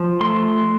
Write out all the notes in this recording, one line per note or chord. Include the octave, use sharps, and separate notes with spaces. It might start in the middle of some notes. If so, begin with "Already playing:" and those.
Already playing: F3
A3 C6